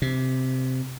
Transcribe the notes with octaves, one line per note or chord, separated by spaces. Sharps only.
C3